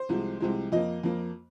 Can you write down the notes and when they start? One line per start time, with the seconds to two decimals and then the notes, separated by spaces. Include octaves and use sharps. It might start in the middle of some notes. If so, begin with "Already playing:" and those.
Already playing: C5
0.09 C2 C3 F3 G#3
0.40 C2 C3 F3 G#3
0.72 F2 F3 A#3 D#5
1.03 F2 F3 A#3